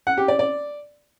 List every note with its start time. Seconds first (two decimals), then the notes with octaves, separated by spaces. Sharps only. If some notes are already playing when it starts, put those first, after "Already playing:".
0.07 F#5
0.18 G4
0.28 D5
0.39 D5